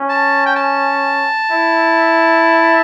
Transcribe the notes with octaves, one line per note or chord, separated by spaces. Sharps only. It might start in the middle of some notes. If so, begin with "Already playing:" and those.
Already playing: C#4
A5
G5
A5
E4